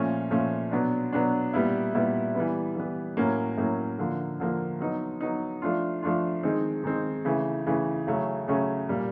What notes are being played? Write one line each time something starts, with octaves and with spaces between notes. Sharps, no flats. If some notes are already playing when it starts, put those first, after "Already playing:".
Already playing: A#2 F3 A3 C#4
A#2 F3 A3 C#4
B2 F#3 B3 D4
B2 F#3 B3 D4
A#2 G3 B3 E4
A#2 G3 B3 E4
E3 G3 B3
E3 G3 B3
A2 F#3 A#3 C#4
A2 F#3 A#3 C#4
D3 F3 A#3
D3 F3 A#3
F#3 B3 D#4
F#3 B3 D#4
F3 A3 D4 F4
F3 A3 D4 F4
D#3 G#3 C4 D#4
D#3 G#3 C4 D#4
C#3 E3 A3
C#3 E3 A3
C#3 F#3 A3 C#4
C#3 F#3 A3 C#4
A#2 G3 A#3